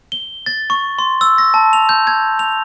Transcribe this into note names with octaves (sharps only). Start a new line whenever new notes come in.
G7
A6
C#6
C6
E6
A#6
A5
F7
G6
G#6
F7